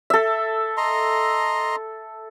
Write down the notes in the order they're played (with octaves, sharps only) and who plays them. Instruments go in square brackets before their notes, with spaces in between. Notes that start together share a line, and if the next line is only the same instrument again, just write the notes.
[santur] A4 E5
[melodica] D#5 A#5 C6